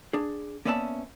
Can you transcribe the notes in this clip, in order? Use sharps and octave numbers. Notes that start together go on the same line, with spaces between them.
D4 G#4
A#3 B3 C#4 D5 E5 A5